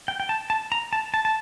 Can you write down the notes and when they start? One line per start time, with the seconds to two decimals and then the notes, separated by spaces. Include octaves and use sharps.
0.08 G5
0.20 G5
0.29 A5
0.50 A5
0.72 A#5
0.93 A5
1.14 A5
1.25 A5